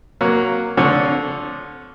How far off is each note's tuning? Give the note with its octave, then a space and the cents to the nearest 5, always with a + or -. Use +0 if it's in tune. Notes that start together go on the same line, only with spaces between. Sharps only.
F#3 +0 A#3 +0
D3 -10 F3 +0 C#5 +5